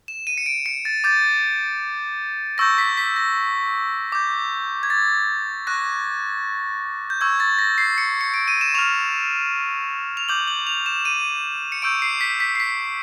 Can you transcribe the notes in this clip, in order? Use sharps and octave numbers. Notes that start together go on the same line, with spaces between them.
E7
D#7
C#7
D7
C#7
A6
D6 G6 A6
C#6 E6 G6 A#6
B6
B6
A#6
D6 G6
G#6
A6
C#6 F#6 A#6
G6
C#6 E6 G6 G#6
A6
A#6
C7
C#7
C#7
D7
D#7
E7
C#6 F6 F7
F7
D6 G6 F#7
F#7
F7
E7
D#7
C#7
C#6 E6 G6 D7
C7
B6
B6
C7
B6